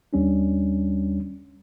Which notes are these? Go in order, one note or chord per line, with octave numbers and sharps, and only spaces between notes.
D#2 G3 C#4 D4